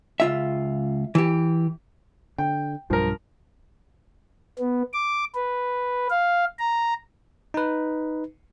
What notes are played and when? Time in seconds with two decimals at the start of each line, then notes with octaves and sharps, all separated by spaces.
0.20 C#2 F4 E5
1.15 E3 G4
2.38 D3 G5
2.90 B1 G2 F3 A#4
4.59 B3
4.93 D6
5.35 B4
6.10 F5
6.59 A#5
7.54 D#4 B4